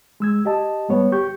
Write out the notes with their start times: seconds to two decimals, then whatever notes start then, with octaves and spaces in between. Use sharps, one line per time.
0.20 G#3 E6 G#6
0.45 G4 D#5 A5
0.88 G#2 G3 B3 C#5
1.12 G4 C#6 G6